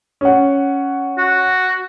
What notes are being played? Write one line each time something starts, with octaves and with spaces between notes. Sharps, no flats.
C#4 F#5
F#4